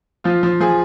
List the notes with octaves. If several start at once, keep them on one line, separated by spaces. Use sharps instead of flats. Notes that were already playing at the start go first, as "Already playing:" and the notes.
F3 F4
F3
F3 G#4